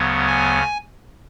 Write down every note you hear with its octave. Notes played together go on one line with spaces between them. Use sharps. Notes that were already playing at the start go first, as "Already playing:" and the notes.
Already playing: D2 C#3 F#3 B3
G#5